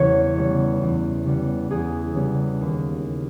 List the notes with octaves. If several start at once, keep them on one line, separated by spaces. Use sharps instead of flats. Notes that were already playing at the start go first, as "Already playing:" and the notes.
Already playing: E2 C#3 G3 B3 C#5
C#3 G3 B3
E2
C#3 G3 B3
E2 G#4
C#3 G3 B3
D#2